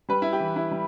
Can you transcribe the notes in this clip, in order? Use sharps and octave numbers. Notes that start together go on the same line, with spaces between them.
G3 B4
E4
G4
E3
E4
G3